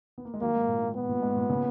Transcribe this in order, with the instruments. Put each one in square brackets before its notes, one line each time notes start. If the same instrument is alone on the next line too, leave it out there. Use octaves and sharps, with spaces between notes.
[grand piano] B3
A#3
G#3
[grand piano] D#3 F#3 [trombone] A#3
[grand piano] G#2
A#2
G#2
[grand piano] A#2 [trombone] B3
[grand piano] A#2
G#2
A#2
A#2 C#3